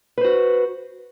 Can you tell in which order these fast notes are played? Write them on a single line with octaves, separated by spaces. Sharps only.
B4 C5 F#4